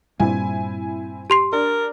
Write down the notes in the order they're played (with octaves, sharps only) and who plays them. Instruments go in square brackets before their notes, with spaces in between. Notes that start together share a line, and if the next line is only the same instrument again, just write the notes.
[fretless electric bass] G2 A#2 G3 [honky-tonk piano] C4 E4 G#5
[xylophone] G4 C6 C7
[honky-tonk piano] D4 [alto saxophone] A#4